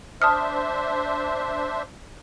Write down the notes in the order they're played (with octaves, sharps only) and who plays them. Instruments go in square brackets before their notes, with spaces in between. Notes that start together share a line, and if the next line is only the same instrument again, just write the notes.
[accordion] D4 C5 E5 [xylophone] A5 D#6 F6